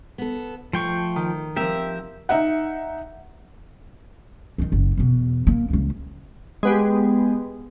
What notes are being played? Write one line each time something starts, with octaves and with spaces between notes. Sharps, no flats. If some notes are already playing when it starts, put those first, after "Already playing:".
B3 A4
F3 A3 G5 C#6
D#3
F3 C4 G4 A#4 E5
D#4 E5 F#5
D#3 F#3
F#1
E2 B2
A#3
C#2 E3
G#3 B3 G4